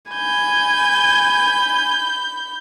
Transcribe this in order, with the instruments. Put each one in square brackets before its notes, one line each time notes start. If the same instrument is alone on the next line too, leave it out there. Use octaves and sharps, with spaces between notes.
[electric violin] G#5 [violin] B5 G6